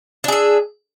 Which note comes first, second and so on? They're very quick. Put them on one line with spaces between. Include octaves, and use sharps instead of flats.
D4 G#4 E5